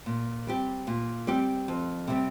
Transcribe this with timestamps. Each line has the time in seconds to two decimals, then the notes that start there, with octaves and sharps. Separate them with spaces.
0.06 A#2
0.47 G3 C4 G4
0.87 A#2
1.27 G3 C4 G4
1.68 F2
2.07 C3 G3 C4